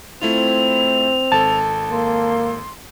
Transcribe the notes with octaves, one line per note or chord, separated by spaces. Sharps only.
A3 C4 E4 F4 F7
G#1 A4 A5
A#3 C6